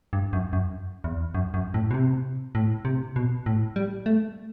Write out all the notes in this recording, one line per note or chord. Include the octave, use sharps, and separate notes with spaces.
G2
F#2
F#2
E2
F#2
F#2
A2
B2
C3
A2
C3
B2
A2
G3
A3